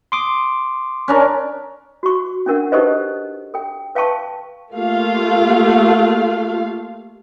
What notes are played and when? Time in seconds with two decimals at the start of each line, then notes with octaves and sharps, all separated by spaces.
0.12 C6 D6 D#6
1.08 C#4 D4 A#4
2.03 F#4 C#6
2.46 C#4 D4 A#4 F#5
2.72 D#4 G4 A4 B4 C5 D#5
3.54 A4 G5
3.95 B4 F5 G5 A5 C#6
4.74 A3 A#3 F4 G4 F5